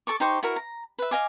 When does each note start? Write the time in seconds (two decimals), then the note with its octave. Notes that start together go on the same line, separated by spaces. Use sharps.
0.07 A4 A5 C#6 D6
0.20 D#4 G4 C5 C#6
0.43 E4 F#4 A#4
0.56 A#5
0.99 B4 E5
1.11 D#5 F5 G#5 D6